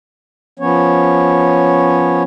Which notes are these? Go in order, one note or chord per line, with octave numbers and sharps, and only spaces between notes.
F3 B3 C#4 C#5